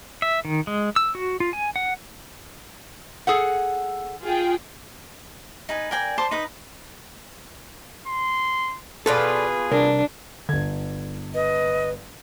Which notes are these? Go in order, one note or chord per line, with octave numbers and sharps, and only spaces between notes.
E5
D#3
G#3
E6
F#4
F4
G#5
F#5
G#4 A4 F#5
F4 G#4 G5
D#4 B4 G#5
A#4 D5 G5 G#5
C5 A5 C6 D6
D#4 B4 D#6
C6
B2 F4 G#4 A4 B4 D5
C2 D4 A#4
G1 D3 G#6
B4 D#5